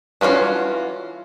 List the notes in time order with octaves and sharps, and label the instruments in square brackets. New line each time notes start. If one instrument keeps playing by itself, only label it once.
[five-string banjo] E3 B3 C#4 F4 F#4